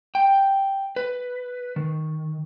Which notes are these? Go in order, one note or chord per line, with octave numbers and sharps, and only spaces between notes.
G5
B4
D#3